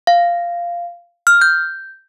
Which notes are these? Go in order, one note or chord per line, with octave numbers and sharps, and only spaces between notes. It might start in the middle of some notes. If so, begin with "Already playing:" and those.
F5
F6
G6